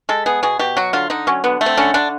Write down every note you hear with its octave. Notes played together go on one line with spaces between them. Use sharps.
G#3 A4
B3 G#4
B2 G#4
B2 G4
F#3 F#4
D3 F4
D3 D#4
F#3 C#4
D3 B3
A3
C4
D3 C#4
D3 D4